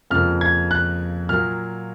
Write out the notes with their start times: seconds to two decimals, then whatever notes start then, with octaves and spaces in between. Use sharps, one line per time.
0.10 F2 C#3 F3 A#3 F6
0.41 G#6
0.71 F#6
1.29 A#2 F#3 A#3 F6